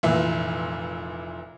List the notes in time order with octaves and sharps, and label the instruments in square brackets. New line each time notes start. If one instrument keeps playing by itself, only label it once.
[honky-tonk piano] F1 A#2 E3 E5